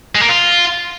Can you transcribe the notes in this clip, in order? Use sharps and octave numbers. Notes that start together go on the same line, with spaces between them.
G#3
A#3
F4